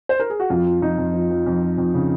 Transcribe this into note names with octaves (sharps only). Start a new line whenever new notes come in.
C5
A#4
G#4
F#4
F2 F4
F3
F2 D#4
F2
F3
F3
F2
F3
F2
C#3